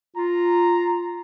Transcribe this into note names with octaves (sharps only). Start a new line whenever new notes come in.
F4 A#5